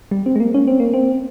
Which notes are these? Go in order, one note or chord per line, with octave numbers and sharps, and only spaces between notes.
G3
C4
G#3
A#3
C#4
C4
A#3
C4